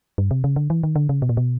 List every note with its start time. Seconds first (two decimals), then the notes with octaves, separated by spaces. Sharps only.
0.18 G2
0.31 C3
0.44 C#3
0.56 D3
0.70 E3
0.83 D#3
0.96 D3
1.09 C#3
1.22 B2
1.29 A#2
1.37 B2